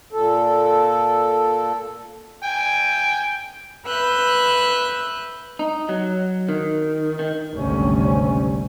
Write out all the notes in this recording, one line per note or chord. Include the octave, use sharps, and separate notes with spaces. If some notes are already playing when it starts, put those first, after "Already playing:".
A#2 A4
G5 G#5
B4 E5 F#6 G6
D#4
F#3
D#3
D#3
G#1 D2 C3 G3 C#4